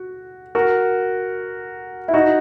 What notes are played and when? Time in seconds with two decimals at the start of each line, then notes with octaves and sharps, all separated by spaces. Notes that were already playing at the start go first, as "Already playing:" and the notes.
Already playing: F#4
0.55 F#4 A#4
2.08 E4
2.14 D#4 F#4